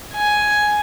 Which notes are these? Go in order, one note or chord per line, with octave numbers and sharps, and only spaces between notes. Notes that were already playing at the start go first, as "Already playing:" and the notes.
G#5